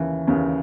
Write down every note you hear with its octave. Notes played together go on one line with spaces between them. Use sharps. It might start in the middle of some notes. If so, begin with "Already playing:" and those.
Already playing: D#2 C#3 E3
D#2 C#3 E3